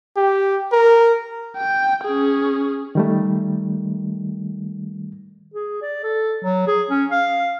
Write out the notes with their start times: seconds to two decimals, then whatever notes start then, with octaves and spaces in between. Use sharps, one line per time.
0.17 G4
0.72 A#4
1.58 G5
2.04 C#4 G#4
2.95 D#3 G3 A3
5.54 G#4
5.82 D5
6.04 A4
6.44 F#3
6.67 G#4
6.90 C#4
7.11 F5